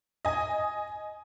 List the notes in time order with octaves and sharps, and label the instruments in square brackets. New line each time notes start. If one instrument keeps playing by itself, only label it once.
[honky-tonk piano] D#5 G#5